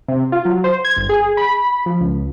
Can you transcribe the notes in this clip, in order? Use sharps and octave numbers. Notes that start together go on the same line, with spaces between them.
C3
F4
F#3
C5
G#6
G1
G#4
B5
F3
C#2